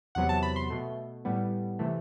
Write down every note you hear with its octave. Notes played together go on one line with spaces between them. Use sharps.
E2 C3 F#3 B3 F#5
A5
B5
C6
B2 A3
A2 G3 B3
C3 E3 A3